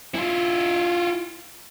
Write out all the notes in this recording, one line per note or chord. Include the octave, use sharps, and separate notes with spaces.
E4 F4